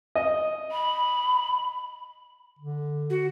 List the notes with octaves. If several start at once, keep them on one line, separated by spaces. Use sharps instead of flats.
D#5
B5
D3
F#4